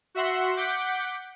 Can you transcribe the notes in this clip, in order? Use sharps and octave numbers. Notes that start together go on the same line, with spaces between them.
F#4 E5 F#5 C6
F#5 D6 G6 B6